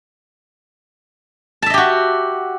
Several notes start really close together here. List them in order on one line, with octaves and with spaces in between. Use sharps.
A5 E5 D#5 G4 F#4